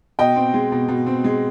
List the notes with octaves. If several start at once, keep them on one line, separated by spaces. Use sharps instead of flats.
B2 D#5 G5
C4
G#3
B2
B2
C4
G#3